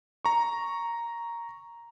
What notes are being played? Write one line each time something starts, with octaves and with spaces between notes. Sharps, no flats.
A#5 C#6